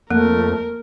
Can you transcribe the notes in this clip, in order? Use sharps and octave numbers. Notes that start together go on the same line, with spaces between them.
F2 A3 A#3 A#4